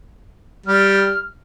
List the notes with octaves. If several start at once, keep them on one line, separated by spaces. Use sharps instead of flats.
G3 F6